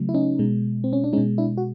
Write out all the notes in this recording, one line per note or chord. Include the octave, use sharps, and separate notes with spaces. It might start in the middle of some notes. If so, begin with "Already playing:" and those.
Already playing: C#3 F#3 A3
E4
C#4 D#4
B2 G#3
C4
C#4
D4
B2 G#3 C#4 D#4
D4 E4
F#4